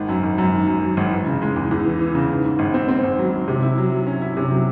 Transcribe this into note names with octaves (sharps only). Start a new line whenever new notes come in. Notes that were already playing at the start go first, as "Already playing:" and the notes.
Already playing: G#1 D#3
F#2
G#1
F#2
D#3
F#2
F#3
G#1
E3
C#3
G#3
E2
E2
E3
E3
C#3
G#2
G#2
G#1
C4
C4
G#1
F#3
F#3
C3
E4
F#3
F#3
C#4
E4
C3
F#3